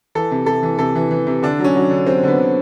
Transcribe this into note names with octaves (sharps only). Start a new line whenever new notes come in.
E3 A4
C3
C3 A4
E3
C3 A4
E3
E3
C3
D3 D4
F#3 C#4
F#3
D3
F#3 C4
D3 B3
D3